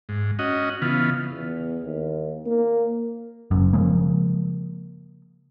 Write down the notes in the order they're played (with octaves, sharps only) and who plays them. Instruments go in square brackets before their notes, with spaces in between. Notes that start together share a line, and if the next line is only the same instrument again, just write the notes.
[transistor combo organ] G#2
C#4 F#4 D#5
C#3 E3 B3 F4
[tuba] E2
D#2
A#3
[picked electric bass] F#1 F#2
C#3 F3 G#3 A#3